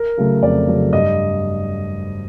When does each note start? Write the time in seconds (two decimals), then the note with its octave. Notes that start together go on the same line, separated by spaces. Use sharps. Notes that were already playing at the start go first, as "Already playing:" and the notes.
Already playing: A#4
0.18 C#3 F#3 A3
0.42 F2 D5
0.68 C#3 F#3 A3
0.92 G2 D#5